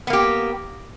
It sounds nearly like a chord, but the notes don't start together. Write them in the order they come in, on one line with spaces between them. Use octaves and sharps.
B3 A#3 G4